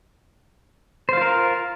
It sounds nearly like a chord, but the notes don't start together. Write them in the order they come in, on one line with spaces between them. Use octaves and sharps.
C5 F5 F4 A#4